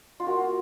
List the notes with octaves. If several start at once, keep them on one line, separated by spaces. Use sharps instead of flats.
F4
A#3 F#4